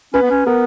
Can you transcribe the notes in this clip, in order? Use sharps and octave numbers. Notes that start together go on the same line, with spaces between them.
C#4 B4
B3
C#4
B3 A#4